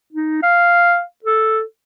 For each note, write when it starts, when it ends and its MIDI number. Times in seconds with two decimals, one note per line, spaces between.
0.13 0.39 63
0.43 1.02 77
1.24 1.61 69